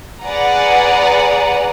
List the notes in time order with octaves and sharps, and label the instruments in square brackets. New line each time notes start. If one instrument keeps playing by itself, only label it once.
[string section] G#4 B4 D5 F#5 G#5 A#5